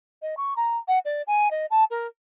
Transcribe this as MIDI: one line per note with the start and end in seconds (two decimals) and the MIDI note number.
0.22 0.35 75
0.37 0.54 85
0.57 0.77 82
0.88 0.99 78
1.05 1.22 74
1.27 1.49 80
1.51 1.66 75
1.71 1.84 81
1.91 2.07 70